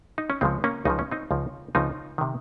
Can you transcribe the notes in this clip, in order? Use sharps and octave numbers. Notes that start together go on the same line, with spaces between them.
D#4
C#4
C#2 C#3 F3 G#3 C4
A#3 C#4
C#2 C#3 F3 D#4
C#4
C4 D#4
C#2 C#3 F3
C#2 C#3 F3 C4 D#4
C3 D#3